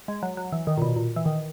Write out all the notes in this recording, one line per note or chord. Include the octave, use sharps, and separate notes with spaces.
G#3
F#3
F#3
E3
D#3
A#2
B2
A#2
E3
D#3